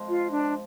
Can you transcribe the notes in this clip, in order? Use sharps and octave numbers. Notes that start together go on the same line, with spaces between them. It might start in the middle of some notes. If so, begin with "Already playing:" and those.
Already playing: F2 F3 G#3
F4
D4